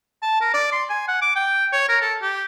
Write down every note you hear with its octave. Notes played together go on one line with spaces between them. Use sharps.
A5
A#4
D5
C6
G#5
F#5
D6
G5
C#5
A#4
A4
G4